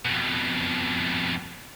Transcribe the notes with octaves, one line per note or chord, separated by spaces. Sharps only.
F2 B2